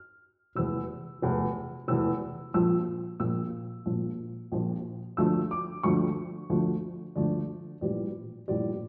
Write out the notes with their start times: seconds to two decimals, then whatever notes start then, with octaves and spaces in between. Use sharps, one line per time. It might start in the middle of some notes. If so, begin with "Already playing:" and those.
Already playing: F6
0.55 F1 E2 E3 E6
1.22 F1 E2 E3
1.88 F1 E2 E3 E6
2.54 A#1 A#2 F3 E6
3.20 A#1 A#2 F3 E6
3.86 A#1 A#2 F3
4.52 A#1 A#2 F3
5.17 D2 D3 F3 A3 E6
5.51 D6
5.83 D2 D3 F3 A3 C#6
6.50 D2 D3 F3 A3
7.16 D2 D3 F3 A3 D5
7.81 A#1 A2 E3 G3 D5
8.48 A#1 A2 E3 G3 D5